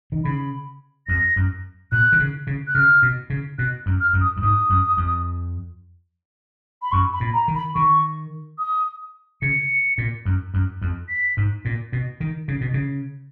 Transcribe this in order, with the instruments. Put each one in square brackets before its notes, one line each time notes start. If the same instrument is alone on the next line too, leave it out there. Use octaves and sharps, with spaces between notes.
[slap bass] D#3
[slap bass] C#3 [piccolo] B5
[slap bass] F2 [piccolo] A#6
[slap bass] F#2
[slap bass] A#2 [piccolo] F#6
[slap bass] D#3
C#3
C#3
[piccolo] F#6
[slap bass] C#3 [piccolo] F6
[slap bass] B2
C#3
[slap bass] B2 [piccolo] F#6
[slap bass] F#2
[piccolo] F6
[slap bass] F#2
[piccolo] D#6
[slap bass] F#2
[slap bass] G#2 [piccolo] D#6
[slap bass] F#2
F2
[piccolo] B5
[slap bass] F#2 [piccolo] C#6
[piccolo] B5
[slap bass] A#2
[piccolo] A#5
[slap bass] D#3
[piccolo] B5
[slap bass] D#3 [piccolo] C#6
[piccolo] D#6
[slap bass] C#3 [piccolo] C#7
[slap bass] A#2
F#2
F#2
F2
[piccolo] B6
[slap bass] G#2
A#2
B2
D#3
C#3
B2
C#3